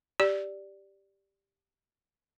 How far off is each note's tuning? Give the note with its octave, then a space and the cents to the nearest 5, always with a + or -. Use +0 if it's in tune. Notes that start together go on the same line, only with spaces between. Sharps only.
G4 +0 D5 +0